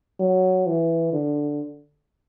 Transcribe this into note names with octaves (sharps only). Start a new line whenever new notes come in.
F#3
E3
D3